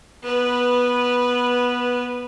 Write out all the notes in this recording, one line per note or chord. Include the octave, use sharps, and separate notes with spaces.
B3 B4